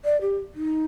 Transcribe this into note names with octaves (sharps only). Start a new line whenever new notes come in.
D5
G4
D#4